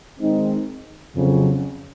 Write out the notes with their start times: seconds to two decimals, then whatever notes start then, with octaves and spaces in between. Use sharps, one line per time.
0.20 D#3 G#3 C4 D#4
1.15 F2 C#3 F#3